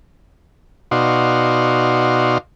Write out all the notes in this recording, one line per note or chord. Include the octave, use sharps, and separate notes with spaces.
B2 D#4 F#4 D5 F5 C6